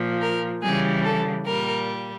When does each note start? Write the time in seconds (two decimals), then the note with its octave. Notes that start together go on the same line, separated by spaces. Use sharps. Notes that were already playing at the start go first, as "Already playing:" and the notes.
Already playing: A#2 F3
0.21 A#4
0.62 C#3 E3 G3 G#4
1.04 A4
1.46 A#2 G3 A#4